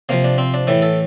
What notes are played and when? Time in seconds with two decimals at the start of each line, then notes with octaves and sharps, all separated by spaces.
0.09 C3 F3 A#3
0.24 D4
0.38 C4
0.54 D4
0.67 A2 E3 E4
0.82 A4